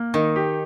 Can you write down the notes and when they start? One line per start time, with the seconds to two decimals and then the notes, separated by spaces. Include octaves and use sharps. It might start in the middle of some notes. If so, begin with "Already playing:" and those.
Already playing: A#3
0.14 D#3 D#4
0.36 G4